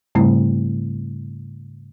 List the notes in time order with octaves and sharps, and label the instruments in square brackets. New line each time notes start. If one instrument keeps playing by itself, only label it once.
[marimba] G#2 C#3 G3 A3 C4 E4